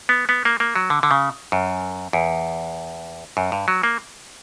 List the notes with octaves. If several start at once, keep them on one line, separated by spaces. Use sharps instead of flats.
B3
B3
A#3
A#3
F#3
D3
D3
C#3
F#2
E2
F#2
G2
F#3
A#3